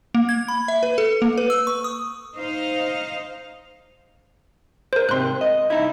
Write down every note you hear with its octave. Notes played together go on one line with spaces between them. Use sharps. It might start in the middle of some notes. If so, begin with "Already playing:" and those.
A#3
G#6
B5
E5
B4
A4
A#3
B4
E6
C#6
D#6
D#4 C5 F5
A#4 C5
G#2 C3 C6 F#6
D#5
C2 D#4 E4